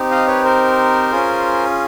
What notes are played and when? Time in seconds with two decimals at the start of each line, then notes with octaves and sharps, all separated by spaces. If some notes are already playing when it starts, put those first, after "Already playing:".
Already playing: C4 D#4 G4
0.11 D#5 F5
0.27 B4 C#5
0.44 A#4 C5
1.12 C#4 F4 G#4